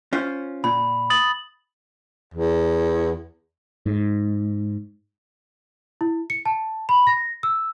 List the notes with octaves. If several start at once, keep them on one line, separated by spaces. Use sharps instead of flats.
C#4 F4 C5
A#2 B5
D#6 A6 F#7
E2
G#2
E4
C#7
A5
B5
A#6
E6